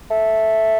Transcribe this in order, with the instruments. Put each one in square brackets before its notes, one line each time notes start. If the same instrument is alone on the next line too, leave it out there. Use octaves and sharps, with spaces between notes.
[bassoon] A3